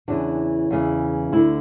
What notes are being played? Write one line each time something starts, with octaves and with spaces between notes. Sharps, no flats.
E2 C#3 E3 D4
E2 C#3 E3
D2 D3 E4